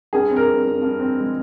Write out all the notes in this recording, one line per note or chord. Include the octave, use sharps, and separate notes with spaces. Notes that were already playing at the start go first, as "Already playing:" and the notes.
G2 G#4
C4
A#4
G2
G2
G2
C4
G#3